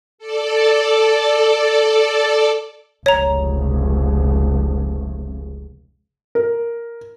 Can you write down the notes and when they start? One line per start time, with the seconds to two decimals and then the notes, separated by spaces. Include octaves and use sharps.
0.18 A4 D5
3.06 F1 C#2 C#5 A#5
6.35 A#4